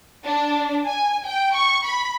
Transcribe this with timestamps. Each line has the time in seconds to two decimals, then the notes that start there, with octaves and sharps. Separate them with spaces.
0.24 D4
0.85 G#5
1.26 G5
1.54 C#6
1.84 B5